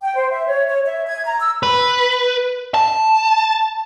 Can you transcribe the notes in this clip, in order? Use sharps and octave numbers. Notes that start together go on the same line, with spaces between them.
G5
C5
E5
C#5
C#5
E5
G#6
A#5
E6
B4
A5